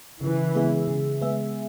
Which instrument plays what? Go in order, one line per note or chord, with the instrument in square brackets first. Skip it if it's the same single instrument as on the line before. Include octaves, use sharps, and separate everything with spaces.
[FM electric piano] C#3 [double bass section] E3
[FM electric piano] G#3 B3 G#4 E5
C#3
G#3 B3 G#4 E5